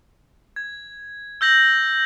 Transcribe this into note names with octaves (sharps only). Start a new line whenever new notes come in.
G#6
E6 G6 A#6 F#7